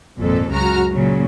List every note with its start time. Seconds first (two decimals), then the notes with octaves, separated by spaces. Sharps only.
0.20 G#1 F2 A#2 A4
0.50 C#2 F#2 C#3 F#4 A#5 F6
0.93 A#2 C#3 F#3